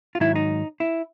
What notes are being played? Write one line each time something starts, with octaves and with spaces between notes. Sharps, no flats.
F4
G#2 D#3 F#3 E4
D#4
E4